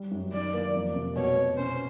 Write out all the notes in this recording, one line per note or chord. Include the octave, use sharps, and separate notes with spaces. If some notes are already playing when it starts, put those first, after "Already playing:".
Already playing: G3
F#2
D#3 D5
A#3
F2
C3
B2 C#5
B2
C#4 C5